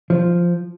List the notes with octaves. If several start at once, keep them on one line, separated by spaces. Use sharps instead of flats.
F3